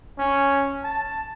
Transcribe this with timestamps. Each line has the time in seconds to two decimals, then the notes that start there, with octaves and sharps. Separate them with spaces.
0.19 C#4
0.84 A5